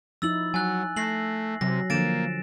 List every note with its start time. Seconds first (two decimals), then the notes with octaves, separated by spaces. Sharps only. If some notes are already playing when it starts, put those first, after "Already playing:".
0.22 F3 D#4 E4 E6 A6 F#7
0.54 F#3 G#5 F#6
0.96 A3 A#6 C7 F#7
1.61 C3 F#3 A#6
1.90 D3 F3 A#3 A6 D7 E7